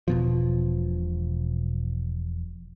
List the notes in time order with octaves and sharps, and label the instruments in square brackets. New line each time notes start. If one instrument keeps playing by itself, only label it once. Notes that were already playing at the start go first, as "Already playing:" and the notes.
[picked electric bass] E1 B2 F3